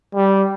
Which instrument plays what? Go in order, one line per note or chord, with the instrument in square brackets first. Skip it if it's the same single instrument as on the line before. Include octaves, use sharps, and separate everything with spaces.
[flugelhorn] G3